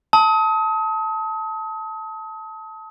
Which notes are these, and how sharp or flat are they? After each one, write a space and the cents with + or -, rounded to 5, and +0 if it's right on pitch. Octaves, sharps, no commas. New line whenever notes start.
A5 +0 D#6 +35